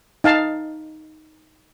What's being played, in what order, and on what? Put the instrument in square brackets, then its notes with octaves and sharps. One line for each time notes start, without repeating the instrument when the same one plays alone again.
[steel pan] D#4 F5 A5